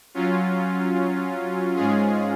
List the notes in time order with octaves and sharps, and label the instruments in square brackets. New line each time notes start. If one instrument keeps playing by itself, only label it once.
[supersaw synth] F#3 C#4 F4
G#2 G#3 C#4 F4 G#4